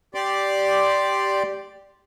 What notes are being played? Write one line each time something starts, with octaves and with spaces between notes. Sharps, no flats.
G4 D5 C6 D6